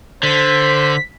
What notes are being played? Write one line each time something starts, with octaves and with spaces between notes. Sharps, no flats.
D3 C5 B6